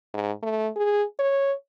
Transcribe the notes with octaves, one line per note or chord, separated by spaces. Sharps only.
G#2
A3
G#4
C#5